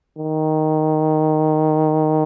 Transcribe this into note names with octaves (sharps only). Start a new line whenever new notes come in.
D#3